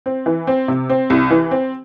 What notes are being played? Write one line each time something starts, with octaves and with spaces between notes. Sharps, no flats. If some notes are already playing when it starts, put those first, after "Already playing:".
C4
E3
C4
C3
C4
C2
E3
C4